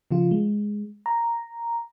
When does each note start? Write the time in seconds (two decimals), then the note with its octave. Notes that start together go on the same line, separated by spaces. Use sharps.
0.11 C#3 F3 F4
0.31 G#3
1.06 A#5